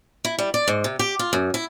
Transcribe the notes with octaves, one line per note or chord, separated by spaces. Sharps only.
E4
G3
D5
G#2
C3
G4
F4
F#2
E4